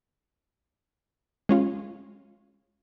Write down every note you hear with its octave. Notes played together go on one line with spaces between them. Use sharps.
G#3 C#4 F4